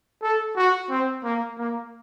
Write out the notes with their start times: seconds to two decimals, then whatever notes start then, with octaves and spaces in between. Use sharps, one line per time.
0.22 A4
0.56 F#4
0.90 C4
1.24 A#3
1.58 A#3